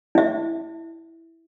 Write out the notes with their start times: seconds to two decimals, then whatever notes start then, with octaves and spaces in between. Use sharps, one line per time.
0.15 E4 E5